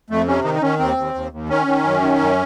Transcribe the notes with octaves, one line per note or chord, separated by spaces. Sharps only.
F2 A3
C3 C#4
D#3 D#4
D#4
D#3 C#4
D#2 C4
D#2
D#2
D#2
D#3 C#4
D#3
F#2
D#3
F#2